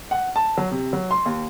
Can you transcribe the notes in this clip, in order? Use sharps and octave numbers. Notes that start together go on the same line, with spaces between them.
F#5
A5
F#3
C3
F#3
C6
D#2